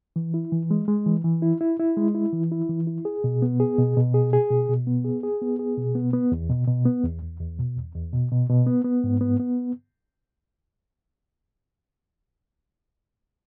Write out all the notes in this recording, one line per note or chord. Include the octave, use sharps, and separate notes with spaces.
E3
E4
E3
G#3
G#3
E3
E3
E4
E4
E4
G#3
E4
E3
E4
E3
E4
G#4
B2
B3
G#4
B2
B2
G#4
G#4
B2
B2
B3
G#4
G#4
B3
G#4
B2
B3
B3
E2
B2
B2
B3
E2
E2
E2
B2
E2
E2
B2
B2
B2
B3
B3
G#2
B3
B3